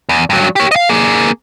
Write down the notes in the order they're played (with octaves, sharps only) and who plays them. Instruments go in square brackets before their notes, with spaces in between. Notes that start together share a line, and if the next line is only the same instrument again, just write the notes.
[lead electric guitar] E2
G2 F#3
G4 C#5
D#5 F5
A#3 G#4